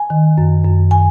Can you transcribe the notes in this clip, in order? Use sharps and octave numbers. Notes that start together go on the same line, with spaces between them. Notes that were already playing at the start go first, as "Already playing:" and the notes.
Already playing: G#5
D#3
F#2
F#2
G#5